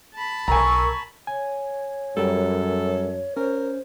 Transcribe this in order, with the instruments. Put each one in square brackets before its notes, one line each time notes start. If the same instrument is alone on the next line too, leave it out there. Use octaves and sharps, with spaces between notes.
[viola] A5 B5
[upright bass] B1 [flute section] A#4 C#6 E6 [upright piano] G#5 A#5
[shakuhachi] C#5 [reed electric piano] G#5
[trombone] F#2 [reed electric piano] G3 A#4 [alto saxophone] A4
[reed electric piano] C#4 [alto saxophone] A#4 [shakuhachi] C5